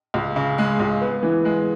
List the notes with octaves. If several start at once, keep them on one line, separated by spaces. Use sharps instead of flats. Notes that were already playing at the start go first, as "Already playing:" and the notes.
C#2
C#3
G#3
C#2
B3
E3
G#3